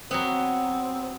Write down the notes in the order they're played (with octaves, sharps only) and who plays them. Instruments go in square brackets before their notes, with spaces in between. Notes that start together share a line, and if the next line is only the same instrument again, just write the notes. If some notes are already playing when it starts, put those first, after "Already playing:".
[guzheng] F#3 B3 [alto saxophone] C4